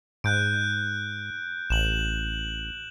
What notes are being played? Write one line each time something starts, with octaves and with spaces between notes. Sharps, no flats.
G#2 F#6 G6 D7
A1 E7 F#7